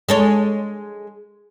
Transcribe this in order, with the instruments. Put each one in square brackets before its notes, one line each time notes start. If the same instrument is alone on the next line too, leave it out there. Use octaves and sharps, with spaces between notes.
[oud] G#3 A4 C#5